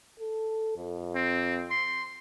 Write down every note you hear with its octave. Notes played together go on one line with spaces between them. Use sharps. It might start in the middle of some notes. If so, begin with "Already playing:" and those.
A4
F2
C4
C6